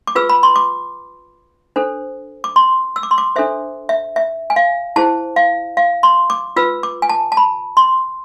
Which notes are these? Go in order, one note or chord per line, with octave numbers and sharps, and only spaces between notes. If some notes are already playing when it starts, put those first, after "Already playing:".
D6
F4 G#4 B4 E6
B5
C6
D6
D4 A4 C5
D6
C6
E6
D6
C6
D6
D4 A4 C5 E5
E5
E5
G#5
F5
E4 G#4 C5 A5
F5
F5
C6
D6
F4 B4 E6
D6
G#5
A5
A5
B5
C6